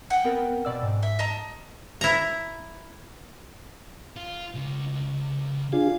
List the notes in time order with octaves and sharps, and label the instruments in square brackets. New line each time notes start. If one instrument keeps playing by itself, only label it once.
[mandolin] F#5 G5
[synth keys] B3 C4 A#4
B2 D5 E6
G#2
[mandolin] E5
D#5 A5 A#5
[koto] E4 A#5
[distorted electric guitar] F4
C#2 C#3
[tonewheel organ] D4 F4 G#4 [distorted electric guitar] F5